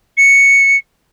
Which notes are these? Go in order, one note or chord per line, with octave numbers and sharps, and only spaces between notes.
C#7